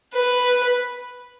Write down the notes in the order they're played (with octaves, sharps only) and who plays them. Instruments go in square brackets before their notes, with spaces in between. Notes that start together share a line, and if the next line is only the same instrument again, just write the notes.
[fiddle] B4